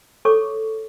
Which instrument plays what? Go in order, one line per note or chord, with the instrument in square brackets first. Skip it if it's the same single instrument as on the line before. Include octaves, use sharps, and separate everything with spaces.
[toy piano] A4 C#5 C#6 D6